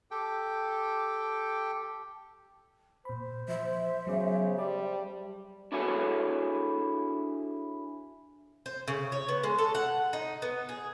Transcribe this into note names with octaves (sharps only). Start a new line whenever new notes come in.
G4 A4 G5
A#2 C5 B5
F3 E5
C#3 F#3 B3 D6
G3 A5 D6
D4 E4 F#4 G#4 A4 C#5
C5
C#3
C#5
B3
G#3
A4
F#5
D#4
B3
G#4